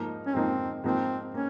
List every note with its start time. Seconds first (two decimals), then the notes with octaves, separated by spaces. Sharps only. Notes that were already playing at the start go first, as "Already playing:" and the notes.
Already playing: G#2 F3 A#3 D#4
0.26 C#4
0.34 G#2 F3 A#3 C4 D#4
0.84 G#2 F3 A#3 C4
1.34 A#3 C#4